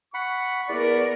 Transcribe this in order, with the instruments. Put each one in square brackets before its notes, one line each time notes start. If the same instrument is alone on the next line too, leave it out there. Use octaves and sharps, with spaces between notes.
[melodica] F#5 B5 [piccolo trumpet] C#6
[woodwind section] E2 D5 [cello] B3 A#4 [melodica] B5